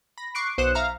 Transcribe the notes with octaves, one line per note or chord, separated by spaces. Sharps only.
B5 A#6
C#6 D6 F#6 C7 D7
B1 C5 D#6 F#6 C#7 E7
E5 F5 A#5 F6